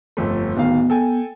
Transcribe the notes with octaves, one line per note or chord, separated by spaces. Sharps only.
G1 F2 A3
D1 D#3 B3 F5
A4 G5 G#5